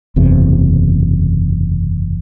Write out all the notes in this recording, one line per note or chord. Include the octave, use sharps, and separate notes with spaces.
F#1 E2 C3